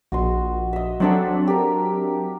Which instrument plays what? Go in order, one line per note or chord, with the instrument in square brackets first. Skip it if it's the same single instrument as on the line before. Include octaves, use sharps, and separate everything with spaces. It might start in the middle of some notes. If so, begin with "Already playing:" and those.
[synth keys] A#1 [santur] F#4 D#5 C6
[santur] D#5 E5
[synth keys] F#3 C4 D4 [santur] A4 E5 F#5
[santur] G4 A#4